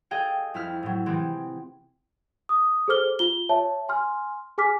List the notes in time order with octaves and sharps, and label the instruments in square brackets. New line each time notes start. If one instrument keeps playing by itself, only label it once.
[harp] G#4 A4 D#5 F5 G5
F2 E4 E5 F6
A2 F#3
C3 E3 G#3 C4
[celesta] D#6
G#4 A4 C5 D6 F6 G7
F4 G7
C#5 E5 A5
G#5 C6 F6
G#4 G#5 D6 F6 B6